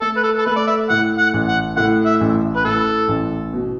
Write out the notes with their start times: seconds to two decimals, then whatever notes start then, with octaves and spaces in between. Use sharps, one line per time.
0.02 A3 A4
0.17 B4
0.23 A4
0.39 A4
0.46 A3 B4
0.56 D5
0.67 E5
0.90 A2 F#5
1.19 F#5
1.34 A1
1.48 F#5
1.77 A2 F#5
2.06 E5
2.21 A1
2.56 B4
2.64 A2 A4
3.08 A1
3.53 B2